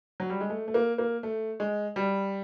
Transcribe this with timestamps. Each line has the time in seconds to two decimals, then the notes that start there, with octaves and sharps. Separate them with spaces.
0.20 F#3
0.30 G3
0.41 G#3
0.50 A3
0.68 A3
0.74 A#3
0.98 A#3
1.23 A3
1.60 G#3
1.96 G3